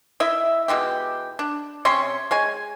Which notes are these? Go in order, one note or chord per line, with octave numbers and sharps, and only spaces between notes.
E4 D#5 E5
B2 E3 G#3 G4
D4
C3 C#4 C#5 C6
G#3 C#5 G#5